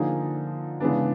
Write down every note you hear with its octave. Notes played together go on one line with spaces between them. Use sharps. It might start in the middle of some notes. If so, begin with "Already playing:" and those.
Already playing: D3 F3 A#3 D#4 G#4
C#3 E3 G#3 B3 D4